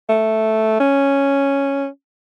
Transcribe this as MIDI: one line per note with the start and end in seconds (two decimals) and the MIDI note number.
0.09 0.77 57
0.80 1.87 61